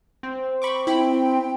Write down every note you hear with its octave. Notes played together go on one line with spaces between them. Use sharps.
C4
B5 C#6 D6
E4 G5 B5